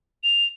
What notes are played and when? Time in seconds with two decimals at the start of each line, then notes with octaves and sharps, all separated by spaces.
0.24 F7